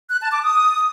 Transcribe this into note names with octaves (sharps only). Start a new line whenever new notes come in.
F#6
A5
D6
D#6